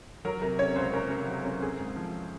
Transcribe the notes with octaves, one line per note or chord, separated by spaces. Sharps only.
F#3 A#4
C3 A#4
C#4 C#5
C#2 C5
C#4 A#4
C3
F#3
C#4
C4 G#4
G#2
F3